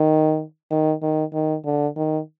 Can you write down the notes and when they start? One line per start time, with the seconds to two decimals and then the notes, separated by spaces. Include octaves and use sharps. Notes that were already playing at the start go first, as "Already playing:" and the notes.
Already playing: D#3
0.71 D#3
1.02 D#3
1.33 D#3
1.65 D3
1.96 D#3